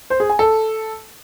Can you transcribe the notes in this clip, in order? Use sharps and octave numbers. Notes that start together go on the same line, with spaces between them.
C5
G#4
G#5
A4